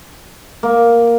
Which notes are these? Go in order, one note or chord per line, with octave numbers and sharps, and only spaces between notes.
A#3